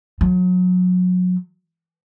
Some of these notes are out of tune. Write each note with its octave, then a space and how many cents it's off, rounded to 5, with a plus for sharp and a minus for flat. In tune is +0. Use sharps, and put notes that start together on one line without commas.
F#3 -30